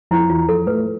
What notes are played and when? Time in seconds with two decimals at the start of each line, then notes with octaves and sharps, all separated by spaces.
0.11 F2 E4
0.30 E2 F4
0.48 F2 A4
0.67 A2 B4